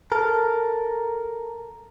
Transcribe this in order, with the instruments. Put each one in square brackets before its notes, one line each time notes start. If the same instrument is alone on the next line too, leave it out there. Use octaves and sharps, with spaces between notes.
[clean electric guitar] A4 A#4